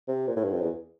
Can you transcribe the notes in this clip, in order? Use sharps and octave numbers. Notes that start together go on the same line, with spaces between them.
C3
A#2
A2
G2
F2
E2